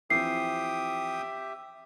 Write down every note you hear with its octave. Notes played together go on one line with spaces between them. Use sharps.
E3 F3 C4 G4 E5 G5 D#6 C7